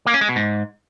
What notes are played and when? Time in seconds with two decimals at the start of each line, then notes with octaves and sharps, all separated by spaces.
0.06 A#3
0.14 C#4
0.21 G#3
0.29 B2
0.36 G#2